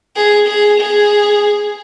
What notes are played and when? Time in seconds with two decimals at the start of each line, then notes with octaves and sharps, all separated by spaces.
0.16 G#4
0.48 G#4
0.81 G#4